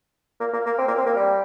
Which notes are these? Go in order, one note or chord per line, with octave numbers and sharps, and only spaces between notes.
A#3
A#3
A#3
C4
A#3
C4
A#3
G3